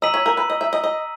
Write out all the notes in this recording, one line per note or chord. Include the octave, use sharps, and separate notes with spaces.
D#5 A#5 E6 B6 D#7 F#7
C#5
A#4
B4
D#5
E5
D#5
D#5